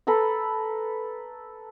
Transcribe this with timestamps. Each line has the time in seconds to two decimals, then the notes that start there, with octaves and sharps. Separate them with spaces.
0.07 A4 B4 A#5